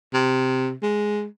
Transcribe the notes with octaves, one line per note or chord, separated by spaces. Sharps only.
C3
G#3